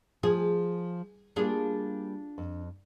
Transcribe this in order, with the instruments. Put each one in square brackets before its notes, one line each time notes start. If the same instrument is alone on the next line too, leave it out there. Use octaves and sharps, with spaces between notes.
[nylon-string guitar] F3 [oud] G#4
[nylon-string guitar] G3 A#3 [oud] D4 F4 G#4
[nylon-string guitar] F2